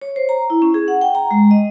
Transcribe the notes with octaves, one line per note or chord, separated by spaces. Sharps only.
C#5
C5
A#5
E4
C#4
G#4
F#5
G5
A#5
G#3
D#5